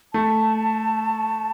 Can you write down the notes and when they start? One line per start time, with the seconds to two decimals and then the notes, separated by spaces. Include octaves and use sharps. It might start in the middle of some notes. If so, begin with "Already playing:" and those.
0.13 A3 A5